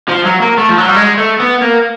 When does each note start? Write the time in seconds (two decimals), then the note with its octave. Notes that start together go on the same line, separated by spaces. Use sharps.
0.09 F3
0.26 F#3
0.42 A#3
0.58 A3
0.69 F3
0.78 F#3
0.87 G3
0.96 G#3
1.18 A3
1.40 B3
1.62 A#3